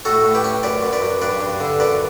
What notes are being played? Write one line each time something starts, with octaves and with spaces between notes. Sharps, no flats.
A2 F#4 A4
A2
G4 B4
C#4
F#2 B4 D5
F#2
B4 D5
F#2
G2 B4 D5
G2
D3
F#2 B4 D5